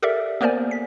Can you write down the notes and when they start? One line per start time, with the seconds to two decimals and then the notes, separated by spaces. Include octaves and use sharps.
0.02 G4 A4 A#4 D5 E5
0.41 A#3 B3 A#4 C5 D5 G#5
0.71 B6